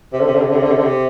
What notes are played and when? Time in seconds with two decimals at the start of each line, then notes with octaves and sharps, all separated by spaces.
0.13 C3
0.21 D3
0.27 C3
0.36 D3
0.42 C3
0.50 D3
0.56 C3
0.63 D3
0.71 C3
0.78 D3
0.85 C3